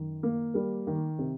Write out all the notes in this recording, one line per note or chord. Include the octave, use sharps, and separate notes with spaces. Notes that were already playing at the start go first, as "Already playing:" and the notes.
Already playing: F#2 D#3
A#3
G3 A#4
D#3
C3